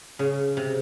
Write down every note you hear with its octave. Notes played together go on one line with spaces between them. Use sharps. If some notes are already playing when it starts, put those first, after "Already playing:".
C#3
C3